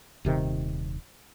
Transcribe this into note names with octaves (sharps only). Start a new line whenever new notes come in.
D#1 C3 D#3